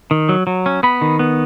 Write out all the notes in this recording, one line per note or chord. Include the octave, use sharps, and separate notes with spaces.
D#3
F#3
F#3
C#4
B3 B5
D#3
B3